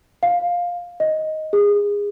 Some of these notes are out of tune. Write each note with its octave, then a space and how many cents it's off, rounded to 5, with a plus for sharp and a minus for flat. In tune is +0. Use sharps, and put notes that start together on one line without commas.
F5 +10
D#5 +5
G#4 -25